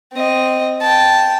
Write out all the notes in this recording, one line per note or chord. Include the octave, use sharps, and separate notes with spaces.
C4 D#5
G5 A5